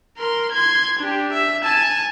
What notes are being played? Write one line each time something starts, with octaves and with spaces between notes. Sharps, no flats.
A#4 C6
C6 G#6
D4 G4
E5
G#5 A5